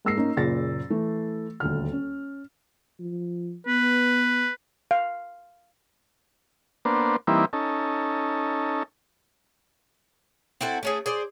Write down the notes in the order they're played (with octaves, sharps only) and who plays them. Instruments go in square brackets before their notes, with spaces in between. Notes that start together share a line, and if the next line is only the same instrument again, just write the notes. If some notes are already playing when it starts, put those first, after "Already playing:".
[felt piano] G#2 A#3 E6 A#6 C7
A#3 C#4 D#4
F#1 A#2 G#4 A6 A#6
E3 A3
D#1 D2 F6
C#4
[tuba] F3
[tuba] B3 [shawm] B4
[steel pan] F5
[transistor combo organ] A#3 B3 D4 C5
E3 G3 A#3 C4 D#4 E4
C#4 D#4 A4
[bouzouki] C4 E4 F#4 A4
A3 C#4 G#4
G#4 C5 D5